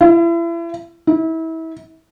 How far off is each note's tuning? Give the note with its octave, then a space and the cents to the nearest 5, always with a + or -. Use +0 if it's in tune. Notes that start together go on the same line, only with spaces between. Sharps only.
E4 +35
E4 -30